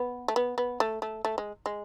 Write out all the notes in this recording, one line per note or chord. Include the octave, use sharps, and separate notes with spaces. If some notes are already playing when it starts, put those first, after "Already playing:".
Already playing: B3
A3
B3
B3
A3
A3
A3
G#3
G#3